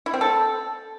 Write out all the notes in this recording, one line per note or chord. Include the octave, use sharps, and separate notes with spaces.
E4
C4
A4